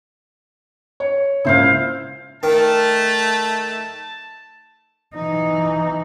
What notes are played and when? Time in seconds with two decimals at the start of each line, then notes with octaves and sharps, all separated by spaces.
1.00 C#5
1.45 C#2 A#2 C#3 E4 C5 F5
2.43 D#3 A3 A5
5.15 E3 D#4